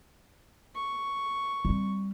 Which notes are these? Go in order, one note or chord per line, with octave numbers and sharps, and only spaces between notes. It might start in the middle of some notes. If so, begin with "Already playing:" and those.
C#6
G3 C4